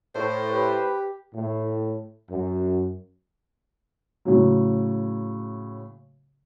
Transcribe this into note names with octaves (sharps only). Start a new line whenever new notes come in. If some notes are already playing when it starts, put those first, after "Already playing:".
A2 C5
G4 B4
A2
F#2
A2 C#3 F#3